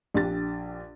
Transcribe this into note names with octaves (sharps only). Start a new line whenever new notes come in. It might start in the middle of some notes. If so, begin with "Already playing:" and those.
A#1 D4 G4 A6